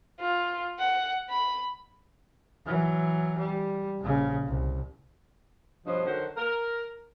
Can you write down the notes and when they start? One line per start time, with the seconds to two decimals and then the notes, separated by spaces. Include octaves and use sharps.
0.20 F4
0.79 F#5
1.29 B5
2.66 E3 F#3
3.38 G3
4.00 A#1 C#3
4.46 C2
5.86 G2 B2 F3 C5 C#5 D#5
6.06 D3 D#3 F#3 F#4 A#4 C5
6.37 A#4